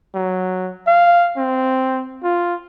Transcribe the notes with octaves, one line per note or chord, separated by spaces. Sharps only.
F#3
F5
C4
F4